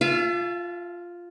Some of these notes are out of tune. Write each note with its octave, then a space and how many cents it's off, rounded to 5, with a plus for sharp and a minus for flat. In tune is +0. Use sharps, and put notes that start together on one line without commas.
F4 +0 E5 +40 A5 -35